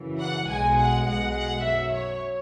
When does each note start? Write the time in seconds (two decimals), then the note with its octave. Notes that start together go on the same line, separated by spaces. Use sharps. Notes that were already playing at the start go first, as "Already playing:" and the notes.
Already playing: F#2 C#3 E3
0.21 F#5
0.49 B1 B2 G#3 G#5
0.78 F#5
1.07 B1 B2 G#3 F#5
1.35 F#5
1.63 F#2 F#3 E5
1.93 C#5